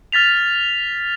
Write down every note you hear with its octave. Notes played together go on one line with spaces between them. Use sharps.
F6 A6 B6 F7